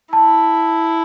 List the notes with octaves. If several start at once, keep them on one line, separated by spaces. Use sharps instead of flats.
E4 A5